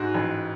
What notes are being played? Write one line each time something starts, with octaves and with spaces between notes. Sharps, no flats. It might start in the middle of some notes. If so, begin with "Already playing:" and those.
Already playing: G#2 F#4
A1